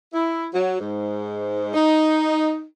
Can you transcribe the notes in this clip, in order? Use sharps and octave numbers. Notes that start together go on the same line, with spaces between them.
E4
F#3
G#2
D#4